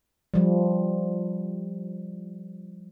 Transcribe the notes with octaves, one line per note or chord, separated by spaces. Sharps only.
F3 G3